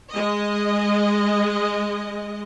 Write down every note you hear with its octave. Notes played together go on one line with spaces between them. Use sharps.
G#3 D#5